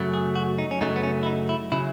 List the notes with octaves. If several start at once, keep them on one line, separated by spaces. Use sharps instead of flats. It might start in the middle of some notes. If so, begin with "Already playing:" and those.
Already playing: F#2 C#3 F#3 A3
G#4
F#4
D#4
C#4
F#2 C#3 F#3 A3 D#4
B3
C#4
E4
D#4
E4
C#3 F#3 E4